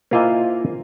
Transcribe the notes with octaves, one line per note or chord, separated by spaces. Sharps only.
A#3 E4 F4 C5 D#5 G#5